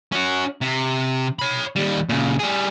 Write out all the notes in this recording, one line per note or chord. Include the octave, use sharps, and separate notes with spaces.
C#4 F#4
C3
C#5 B5
D#2 G3
A#2 C#3
G3 G#4